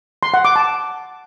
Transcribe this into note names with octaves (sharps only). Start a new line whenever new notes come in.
C6
F#5
D6
A5